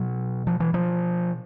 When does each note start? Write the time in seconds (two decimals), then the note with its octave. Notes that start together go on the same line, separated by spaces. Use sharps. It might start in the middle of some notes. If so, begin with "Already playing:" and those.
Already playing: B2 F#3
0.47 F3
0.60 E3
0.74 F3